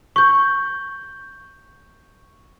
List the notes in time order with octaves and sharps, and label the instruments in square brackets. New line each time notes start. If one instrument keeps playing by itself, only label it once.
[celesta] C#6 G6